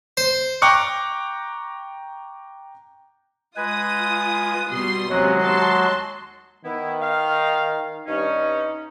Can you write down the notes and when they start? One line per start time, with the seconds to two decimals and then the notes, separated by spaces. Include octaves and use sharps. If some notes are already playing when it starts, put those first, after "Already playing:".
0.17 C5
0.62 G5 A#5 C#6 D6 F#6 C#7
3.56 G#3 F4 B4 G#5 D#6
4.71 B2 G3 C6 D#6
5.10 D#2 C3 F#3 G#3 C#4 F#4
5.43 A5 C6
6.65 D#3 B3 E4
7.02 F5
8.07 G2 C#4 D#4